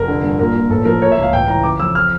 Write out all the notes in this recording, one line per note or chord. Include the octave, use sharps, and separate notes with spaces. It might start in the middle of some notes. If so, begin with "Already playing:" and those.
Already playing: F1 A#4
D3
G2
A#2 A#4
A#2
A1 A4
F3 A#4
A#3 C#5
E5
C#2
F5
A1 G5
E3 A#5
C#3 D6
F2 E6
F6